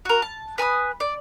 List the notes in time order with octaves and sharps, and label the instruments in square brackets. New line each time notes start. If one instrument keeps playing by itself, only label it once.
[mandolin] F#4 A#4
A5
B4 G#5 A#5 D#6
D5